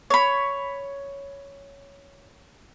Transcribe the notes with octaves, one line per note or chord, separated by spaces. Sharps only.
C#5 B5